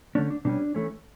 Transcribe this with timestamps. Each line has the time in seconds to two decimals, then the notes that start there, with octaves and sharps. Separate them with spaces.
0.15 D3 A3 C#4 D4
0.30 D4
0.45 B2 G3 C#4 D4
0.75 E3 A3 C#4